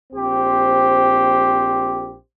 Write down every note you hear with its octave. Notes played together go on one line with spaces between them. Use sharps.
A#1 C4 G4 C5